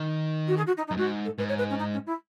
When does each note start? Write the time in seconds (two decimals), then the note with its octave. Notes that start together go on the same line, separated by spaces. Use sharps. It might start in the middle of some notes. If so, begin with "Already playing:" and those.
Already playing: D#3
0.47 F#4
0.56 G#4
0.66 F#4
0.77 D#4
0.87 D#4
0.91 F#2
0.97 G#2 F#4
1.24 A4
1.38 G#2 B4
1.48 C#5
1.58 B4
1.69 C#4
1.78 D#4
1.93 C#4
2.06 E4